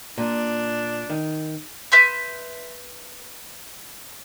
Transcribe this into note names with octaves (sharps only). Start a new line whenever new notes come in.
A#2 D4
D#3
B4 E5 C6 G6